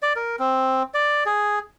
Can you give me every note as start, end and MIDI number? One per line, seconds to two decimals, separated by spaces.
0.02 0.13 74
0.16 0.36 70
0.39 0.83 60
0.94 1.24 74
1.26 1.59 68